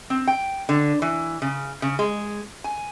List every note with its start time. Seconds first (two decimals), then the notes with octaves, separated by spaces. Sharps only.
0.10 C4
0.27 G5
0.69 D3
1.02 E3
1.42 C#3
1.82 C#3
1.99 G#3
2.64 G#5